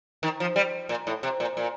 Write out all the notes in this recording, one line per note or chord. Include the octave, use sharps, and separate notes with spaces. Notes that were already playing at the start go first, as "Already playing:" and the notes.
D#3
F3
G3
A#2
A2
C3
A#2
A#2